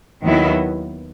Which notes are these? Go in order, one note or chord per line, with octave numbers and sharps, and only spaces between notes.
D#2 D#3 F#3 B3 E4